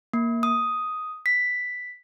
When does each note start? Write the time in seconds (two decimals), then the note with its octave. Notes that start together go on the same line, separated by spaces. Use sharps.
0.13 A#3
0.43 D#6
1.26 B6